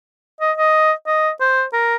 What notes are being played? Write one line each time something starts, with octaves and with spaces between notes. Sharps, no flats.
D#5
D#5
D#5
C5
A#4